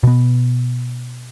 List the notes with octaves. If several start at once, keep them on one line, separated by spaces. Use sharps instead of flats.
B2 B3